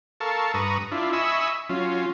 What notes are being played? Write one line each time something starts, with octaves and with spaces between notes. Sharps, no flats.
A4 A#4 F5 A5 C#6
G2 B4 A#5 C#6 D#6
D4 E4 F4
D#5 E5 G#5 B5 C#6 E6
F#3 C#4 F4